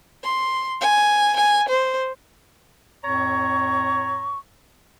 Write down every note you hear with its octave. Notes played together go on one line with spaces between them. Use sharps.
C6
G#5
G#5
C5
F2 A2 C#5 A#5 C#6